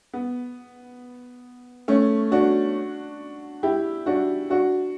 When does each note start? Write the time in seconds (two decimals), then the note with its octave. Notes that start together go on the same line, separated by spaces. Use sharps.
0.13 B3
1.88 A3 C#4
2.32 D4 F#4
3.63 E4 G4
4.06 D4 F#4
4.50 D4 F#4